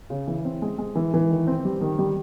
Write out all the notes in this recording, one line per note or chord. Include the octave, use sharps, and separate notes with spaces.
C#3
E3
C4
G#3
G#3
E3
E3
D#3
C4
G3
D#3
G3